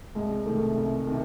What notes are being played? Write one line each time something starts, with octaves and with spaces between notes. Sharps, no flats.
C2 G#3
C3 D#3 A3
C2
C3 D#3